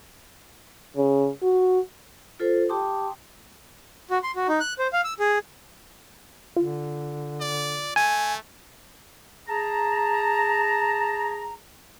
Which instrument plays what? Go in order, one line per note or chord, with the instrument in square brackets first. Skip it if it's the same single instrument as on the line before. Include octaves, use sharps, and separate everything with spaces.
[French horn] C#3
F#4
[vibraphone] F4 A4 C5
G4 G5 A5 C6 D6 D#6
[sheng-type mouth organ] F#4
C6
F#4
D#4
F#6
C5
F5
E6
G#4
[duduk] D3 [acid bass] F4
[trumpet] D5
[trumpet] A3 [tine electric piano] G#5
[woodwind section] G#4 A5 A#5